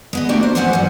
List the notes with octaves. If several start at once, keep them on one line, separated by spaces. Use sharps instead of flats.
G#3 B3 D#5
A3 A#3 D4 F#4 G4 D5
C5
F2 F#3 B3 C5 F#5 G#5
G2 F#3